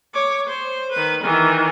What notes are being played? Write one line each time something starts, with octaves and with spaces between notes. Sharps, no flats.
C#5 D6
C5
D#3 B4
D#3 E3